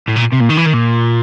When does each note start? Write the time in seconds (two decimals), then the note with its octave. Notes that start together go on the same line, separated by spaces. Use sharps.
0.08 A2
0.16 A#2
0.33 C3
0.41 A#2
0.50 D#3
0.58 E3
0.66 D#3
0.74 A#2